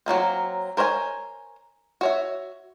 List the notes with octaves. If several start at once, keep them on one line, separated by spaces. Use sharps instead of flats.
F#3 G3 A#3 C4
A#4 C5 C#5 E5 G#5
F#4 C#5 E5